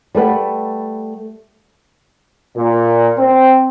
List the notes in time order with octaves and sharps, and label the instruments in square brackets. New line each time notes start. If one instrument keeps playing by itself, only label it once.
[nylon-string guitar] G3 A3 B4 F#5
[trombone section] A#2
C4